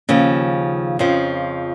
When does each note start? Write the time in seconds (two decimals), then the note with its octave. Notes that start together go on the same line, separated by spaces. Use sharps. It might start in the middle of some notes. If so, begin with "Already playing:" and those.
0.09 D#2 C#3 F3
0.99 F2 C#3 F3